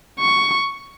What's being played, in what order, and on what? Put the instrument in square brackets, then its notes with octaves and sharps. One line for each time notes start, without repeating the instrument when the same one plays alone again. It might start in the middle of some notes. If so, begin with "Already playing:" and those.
[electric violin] C#6